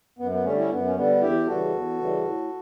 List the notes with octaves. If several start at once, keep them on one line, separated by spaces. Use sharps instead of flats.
F#2 B3
B3
D3 G3 A3 C#4
C#4 E4
F#2 B3
C#4
D3 G3 B3
E2 E4 G4
C#3 E3 G3 F#4 A4
E2
C#3 E3 G3
A2